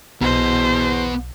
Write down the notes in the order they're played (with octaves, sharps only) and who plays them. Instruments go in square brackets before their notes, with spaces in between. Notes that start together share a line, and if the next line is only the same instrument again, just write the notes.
[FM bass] B1 [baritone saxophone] E2 [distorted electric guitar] B3 D#5 [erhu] C5